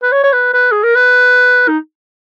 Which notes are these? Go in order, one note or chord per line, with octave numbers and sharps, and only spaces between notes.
B4
C#5
C#5
B4
B4
G#4
A#4
B4
D#4